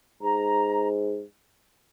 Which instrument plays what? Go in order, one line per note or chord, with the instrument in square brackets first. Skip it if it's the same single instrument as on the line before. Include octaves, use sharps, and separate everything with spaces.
[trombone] G#2 [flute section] A#5